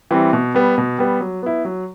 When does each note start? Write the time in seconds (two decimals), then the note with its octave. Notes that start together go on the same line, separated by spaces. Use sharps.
0.11 E3 G3 C4
0.33 B2
0.54 G3 B3
0.78 B2
0.98 G3 B3
1.21 F#3
1.43 B3 E4
1.65 F#3